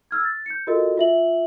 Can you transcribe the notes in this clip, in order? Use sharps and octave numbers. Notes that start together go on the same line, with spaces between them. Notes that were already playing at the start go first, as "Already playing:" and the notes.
E6 F6 G#6
A6
G6 C#7
F4 F#4 A4 A#4 D#5
F4 E5 F#7